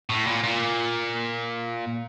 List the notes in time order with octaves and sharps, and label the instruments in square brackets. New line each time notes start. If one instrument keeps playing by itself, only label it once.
[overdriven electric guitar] A2
A#2
A#2